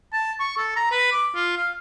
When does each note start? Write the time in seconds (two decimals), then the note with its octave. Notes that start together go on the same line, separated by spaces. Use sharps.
0.13 A5
0.40 C#6
0.57 A4
0.76 A#5
0.92 B4
1.12 D6
1.35 F4
1.57 F5